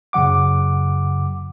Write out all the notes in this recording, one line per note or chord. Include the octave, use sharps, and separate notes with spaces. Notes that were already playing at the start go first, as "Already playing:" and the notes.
F#2 C#3 F#3 F#5 D6